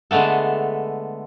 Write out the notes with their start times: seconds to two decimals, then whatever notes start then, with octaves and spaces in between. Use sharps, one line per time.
0.11 D3 G#3 A3 B3 A4